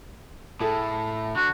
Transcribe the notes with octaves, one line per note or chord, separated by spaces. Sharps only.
A2 G#4 A4
D3 F#4